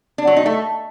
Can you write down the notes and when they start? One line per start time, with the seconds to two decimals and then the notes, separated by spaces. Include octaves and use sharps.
0.18 D4
0.27 F#3
0.37 D#4
0.46 A3